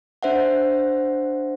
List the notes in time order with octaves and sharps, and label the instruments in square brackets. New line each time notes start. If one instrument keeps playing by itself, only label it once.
[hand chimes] D4 C5 E5 F#5